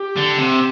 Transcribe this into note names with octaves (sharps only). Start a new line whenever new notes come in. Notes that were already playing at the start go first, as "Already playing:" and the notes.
Already playing: G4
D3
C3